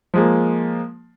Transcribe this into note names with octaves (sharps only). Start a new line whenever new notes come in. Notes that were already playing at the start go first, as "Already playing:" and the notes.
F3 G#3 A#3